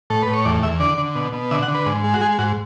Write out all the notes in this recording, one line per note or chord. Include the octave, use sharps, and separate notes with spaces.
A2 A4
A2 B4
C#5
E2 D5
E2 E5
D3 D5
D3
B2
B2
D3 E5
F#5
D3
B4
G#2
G#3
F#4
G#3 G#4
G#2 F#4